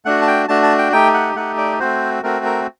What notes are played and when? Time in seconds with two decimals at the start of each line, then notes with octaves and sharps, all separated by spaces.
0.05 A3 D4 F#4 F#5
0.22 A5
0.27 G5
0.48 A3 D4 F#4 A5
0.63 A5
0.78 G5
0.92 A3 D#4 G4 G5
1.14 F#5
1.36 A3 D#4 G4 F#5
1.58 D5
1.80 A3 C4 F#4 C5
2.23 A3 C4 F#4 A#4
2.45 A#4